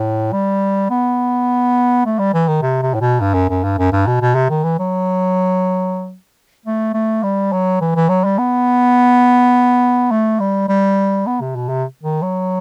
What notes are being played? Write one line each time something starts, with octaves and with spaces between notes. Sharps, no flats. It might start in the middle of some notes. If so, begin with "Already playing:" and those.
Already playing: A2
G3
B3
A3
G3
E3
D#3
C3
C3
A2
B2
G2
F#2
F#2
G2
F#2
G2
B2
B2
C3
D#3
E3
F#3
A3
A3
G3
F#3
E3
E3
F#3
G3
B3
A3
G3
G3
B3
C3
B2
C3
D#3
F#3